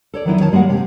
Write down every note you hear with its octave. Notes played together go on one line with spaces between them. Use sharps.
A4 C#5 D5
D#3 F3 F#3 B3 D#4 E4
D#3 C#5 A5
G3 G#3 A#3 F#4 F#5
C3 C4